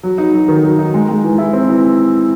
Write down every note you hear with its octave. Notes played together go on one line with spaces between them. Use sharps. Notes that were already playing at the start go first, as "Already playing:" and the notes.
F#3
D#4
F#3
D#3
F#3
D#4
G#3
G#3
E3
E4
C4
E3